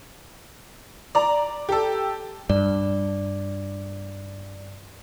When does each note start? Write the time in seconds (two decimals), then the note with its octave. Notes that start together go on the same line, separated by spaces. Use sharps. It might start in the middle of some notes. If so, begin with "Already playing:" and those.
1.15 D5 A#5
1.69 G4 A4
2.50 G2 D5